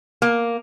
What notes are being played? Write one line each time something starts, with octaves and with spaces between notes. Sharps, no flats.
A#3